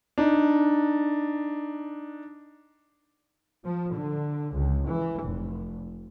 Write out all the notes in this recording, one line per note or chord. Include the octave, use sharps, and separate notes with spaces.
D4 D#4
F3
D3
C#2
E3
F1